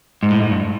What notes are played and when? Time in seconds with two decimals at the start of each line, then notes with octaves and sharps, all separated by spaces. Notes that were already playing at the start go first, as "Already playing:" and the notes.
0.23 G#2
0.30 A2
0.40 G#2
0.51 G2